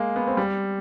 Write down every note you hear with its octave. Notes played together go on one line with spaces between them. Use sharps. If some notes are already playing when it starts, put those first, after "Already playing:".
Already playing: G#3 A#3
B3
C4
G3